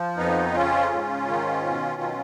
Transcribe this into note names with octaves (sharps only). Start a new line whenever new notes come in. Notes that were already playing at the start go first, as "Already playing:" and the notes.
Already playing: F3
F2 B3 D#4
C#3 C#4 F4
G#2
D#3
B2
F#3